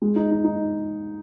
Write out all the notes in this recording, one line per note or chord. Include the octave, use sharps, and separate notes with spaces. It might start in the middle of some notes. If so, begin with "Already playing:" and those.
G#3
D#4
D#4
D#4